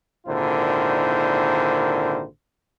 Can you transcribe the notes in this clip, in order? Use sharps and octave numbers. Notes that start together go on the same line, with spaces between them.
G#1 A#2 D3 D#3 E4 C5